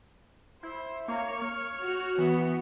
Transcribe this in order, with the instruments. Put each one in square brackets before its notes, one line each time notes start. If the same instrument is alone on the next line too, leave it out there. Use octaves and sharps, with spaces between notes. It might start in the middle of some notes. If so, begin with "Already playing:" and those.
[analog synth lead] E4 [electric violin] C5
[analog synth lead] A#3 [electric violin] C#5
[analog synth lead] F6
[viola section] F#4
[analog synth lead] E3 [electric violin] B3